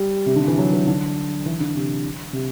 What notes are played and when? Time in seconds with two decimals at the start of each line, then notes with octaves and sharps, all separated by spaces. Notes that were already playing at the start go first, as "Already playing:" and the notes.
Already playing: G3
0.26 C3
0.36 D3
0.47 E3
0.58 F#3
0.73 E3
0.87 D3
1.46 E3
1.60 D3
1.76 C3
2.33 C3